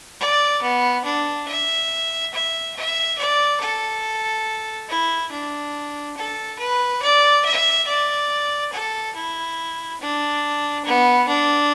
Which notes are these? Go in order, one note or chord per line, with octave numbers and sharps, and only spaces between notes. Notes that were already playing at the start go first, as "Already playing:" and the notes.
D5
B3
D4
E5
E5
E5
D5
A4
E4
D4
A4
B4
D5
E5
D5
A4
E4
D4
B3
D4